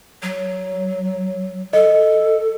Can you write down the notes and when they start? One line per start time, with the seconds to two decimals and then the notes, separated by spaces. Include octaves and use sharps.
0.23 F#3
1.73 A4 D#5